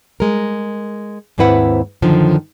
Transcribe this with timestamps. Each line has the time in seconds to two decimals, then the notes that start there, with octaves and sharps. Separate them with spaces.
0.20 G#3 A#4
1.38 D#2 G#2 C4 E4 B4 F#5
2.02 F#2 D3 D#3 F3